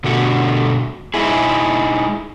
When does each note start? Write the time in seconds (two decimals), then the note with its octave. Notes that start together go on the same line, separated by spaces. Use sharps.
0.04 B2 D3 A3 F#4
1.14 G#3 D#4 E4 G#4